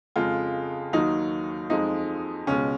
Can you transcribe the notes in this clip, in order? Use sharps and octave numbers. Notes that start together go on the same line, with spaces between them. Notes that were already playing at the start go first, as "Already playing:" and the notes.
F2 C#3 G#3 F4
D#2 D#3 F#3 D#4
F2 F3 G#3 D#4
C#2 B2 G#3 C#4